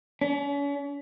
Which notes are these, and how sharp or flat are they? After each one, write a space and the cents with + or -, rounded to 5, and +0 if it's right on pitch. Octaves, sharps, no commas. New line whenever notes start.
C#4 +40